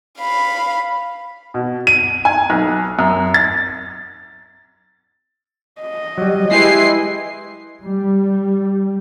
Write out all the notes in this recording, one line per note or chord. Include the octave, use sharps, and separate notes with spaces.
F5 B5
B2
D#7
G#5
B1
F#2
A6
D#5
F#3 G3
G#3 E4 G4 B4 G#5 C6 C7
G3